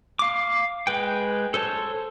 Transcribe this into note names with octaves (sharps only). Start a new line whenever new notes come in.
F5 D6
G#3 B4 G5
A4 C5 C#5 A5